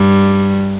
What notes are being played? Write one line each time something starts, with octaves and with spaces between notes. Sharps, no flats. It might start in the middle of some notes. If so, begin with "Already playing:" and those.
Already playing: G2 G3